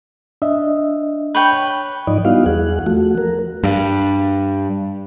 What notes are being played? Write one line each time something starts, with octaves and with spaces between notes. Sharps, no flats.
D4 D#5 E5
B4 C#5 G5
G#2 F3 D#4 D5 D#5
G3 B3 D#4 E4 F#4 F5
E2 G#4 F#5
F3 A3 F#4
A#4
G2